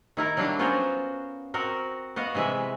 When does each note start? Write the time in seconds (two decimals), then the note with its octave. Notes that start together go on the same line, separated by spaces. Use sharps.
0.17 D#3 E4 A#4
0.37 F#3 G3 A#3 D4 F5 A5
0.59 B3 C#4 F4 F#4 A#4 C5
1.54 C4 F#4 A#4
2.16 B3 F#4 D#5 F5
2.35 C3 E3 G#3 B4 E5